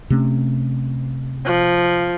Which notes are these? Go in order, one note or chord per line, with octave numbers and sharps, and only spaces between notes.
C3 A3 C#4
F3